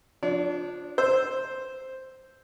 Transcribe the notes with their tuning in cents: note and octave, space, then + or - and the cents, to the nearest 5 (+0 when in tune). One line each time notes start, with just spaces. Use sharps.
F3 +20 D4 +0 D5 -45
C5 +0 E6 +0